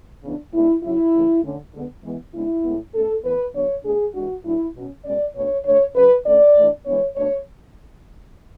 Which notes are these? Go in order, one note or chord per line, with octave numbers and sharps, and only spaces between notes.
C#3 E3 B3 D4
A2 G#3 B3 D4 E4
C#3 F#3 C#4 E4
C#3 E3 A3
D3 A3 C#4
D3 G#3 B3
E3 G#3 B3
C#3 G#3 B3 D4 E4
A2 G#3 B3
B2 A3 C#4 A4
A2 E3 B3 B4
D3 F#3 B3 D4 C#5
B2 A3 D4 G#4
E3 G#3 D4 F#4
A2 F#3 A3 D4 E4
B2 F#3 C#4
B2 G#3 C#4 D5
B2 A3 D4 C#5
D3 A3 D4 C#5
C#3 F#3 C#4 B4
D3 A3 C#4 D5
A2 E3 A3 D4
E3 G#3 B3 D4 C#5
B2 A3 D4 C#5